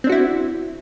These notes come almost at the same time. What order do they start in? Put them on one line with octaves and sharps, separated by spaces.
C4 D4 F#4 E4